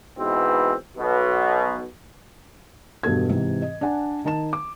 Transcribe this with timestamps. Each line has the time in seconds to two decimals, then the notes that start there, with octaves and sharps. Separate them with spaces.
0.17 G#2 B2 E3 C4
0.97 B1 B2
3.03 E1 G2 B2 A4 G#6
3.29 G#2 C3 E3
3.62 D#5
3.81 D4 D5 F#5 G#5 A5
4.25 D#3 D#4 A5 E7
4.53 D6